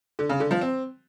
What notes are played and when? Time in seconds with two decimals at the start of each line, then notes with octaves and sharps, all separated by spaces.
0.19 D3
0.29 C#3
0.40 D3
0.51 F3
0.61 C4